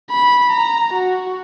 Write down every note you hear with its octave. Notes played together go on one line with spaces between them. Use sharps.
B5
A#5
F#4